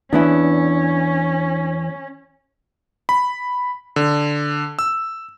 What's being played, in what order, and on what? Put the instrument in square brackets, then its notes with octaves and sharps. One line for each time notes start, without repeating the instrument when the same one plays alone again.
[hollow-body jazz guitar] E2 B3 E4 [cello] C#4 [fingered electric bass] D4
[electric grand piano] B5
D3
E6